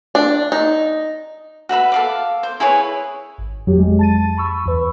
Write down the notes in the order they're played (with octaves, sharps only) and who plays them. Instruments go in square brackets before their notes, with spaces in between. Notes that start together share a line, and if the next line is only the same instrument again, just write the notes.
[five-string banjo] D4
D#4
[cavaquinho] F#4 B4 E5 B5
A4 F5 D6
C5
E4 G#4 B4 C#5
[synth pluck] G#1
[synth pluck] F2 [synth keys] F#3 G4
[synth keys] G#3
A5 A6 D#7
B5 C#6 E6
[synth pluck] E2 B4